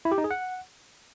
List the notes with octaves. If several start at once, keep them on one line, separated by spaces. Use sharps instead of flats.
E4
G4
D#4
G#4
F#5